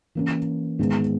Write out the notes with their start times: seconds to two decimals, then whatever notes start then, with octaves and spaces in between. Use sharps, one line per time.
0.15 E3 A#3 C#4
0.79 G#2 D#3 G#3 B3